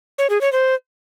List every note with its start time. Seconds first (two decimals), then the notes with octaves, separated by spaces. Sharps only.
0.18 C#5
0.30 G#4
0.41 C#5
0.52 C5